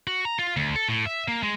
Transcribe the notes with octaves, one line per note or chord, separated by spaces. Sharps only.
F#4
A#5
F4
D2
A4
A2
E5
A#3
G#3